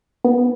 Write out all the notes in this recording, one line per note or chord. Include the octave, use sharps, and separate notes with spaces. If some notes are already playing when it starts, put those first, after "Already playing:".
B3